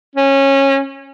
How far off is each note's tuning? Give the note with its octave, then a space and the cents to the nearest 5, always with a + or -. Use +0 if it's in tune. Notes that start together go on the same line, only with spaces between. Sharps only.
C#4 -20